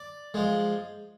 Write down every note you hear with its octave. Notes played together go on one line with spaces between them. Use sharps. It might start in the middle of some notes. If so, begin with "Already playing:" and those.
Already playing: D5
F3 G#3